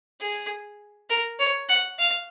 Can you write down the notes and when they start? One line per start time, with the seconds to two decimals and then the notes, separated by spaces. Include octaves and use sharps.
0.21 G#4
1.10 A#4
1.39 C#5
1.69 F#5
1.99 F5